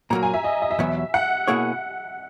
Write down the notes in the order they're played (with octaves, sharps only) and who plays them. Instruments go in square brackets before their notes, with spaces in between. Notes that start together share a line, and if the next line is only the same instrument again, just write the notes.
[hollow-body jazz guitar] A#2 F#3 A#3 [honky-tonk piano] A#5
[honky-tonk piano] G#5
E5
D#5
D#5
E5
[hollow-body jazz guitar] E2 B2 F#3 B3
[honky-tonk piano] F#5
[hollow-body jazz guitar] B2 A#3 E4 G#4 C#5